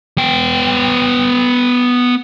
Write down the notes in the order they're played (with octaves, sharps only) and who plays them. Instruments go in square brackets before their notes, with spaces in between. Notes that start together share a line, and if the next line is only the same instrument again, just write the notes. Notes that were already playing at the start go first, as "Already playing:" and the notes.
[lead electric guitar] B3 G5